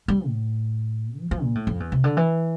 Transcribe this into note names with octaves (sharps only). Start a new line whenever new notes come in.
G3
A2
F3
F3
A#2
A2
F2
E2
C3
D3
E3